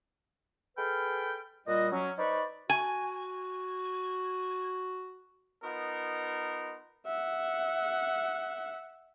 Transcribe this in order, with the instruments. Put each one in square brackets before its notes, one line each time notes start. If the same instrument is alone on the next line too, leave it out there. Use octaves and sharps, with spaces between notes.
[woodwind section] G#4 A4 B4 G5 B5 F6
A#2 G3 F4 F#4 D#5
F#3 C#4
D#4 B4 C5 D5 B5 C#6
[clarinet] F#4 [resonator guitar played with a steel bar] G#5
[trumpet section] B3 D#4 F4 A#4
[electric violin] E5 F#5